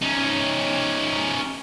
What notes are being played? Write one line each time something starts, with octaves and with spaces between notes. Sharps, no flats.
C#4 D#4